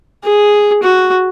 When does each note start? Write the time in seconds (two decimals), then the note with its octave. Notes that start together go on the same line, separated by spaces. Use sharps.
0.24 G#4
0.83 F#4